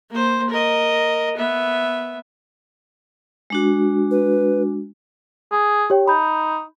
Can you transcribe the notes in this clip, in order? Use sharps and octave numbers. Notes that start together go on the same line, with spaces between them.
A#3 C5
A#4 D#5
B3 E5
G#3 D4 F#4
B4
G#4
G4 C#5 G5
D#4 B5 G6